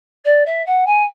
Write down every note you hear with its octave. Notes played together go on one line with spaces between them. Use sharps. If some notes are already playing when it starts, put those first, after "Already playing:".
D5
E5
F#5
G#5